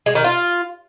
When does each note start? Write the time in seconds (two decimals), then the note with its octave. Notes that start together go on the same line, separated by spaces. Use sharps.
0.06 G#3
0.15 D#3
0.24 F4